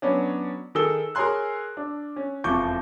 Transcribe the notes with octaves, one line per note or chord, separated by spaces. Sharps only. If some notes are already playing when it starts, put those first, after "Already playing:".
F#3 B3 C#4 D4
D#3 G#4 A4 E6 G7
G#4 A#4 C#5 G#5 C6 F#6
D4
C#4
E1 F2 F3 C#6 D6 G6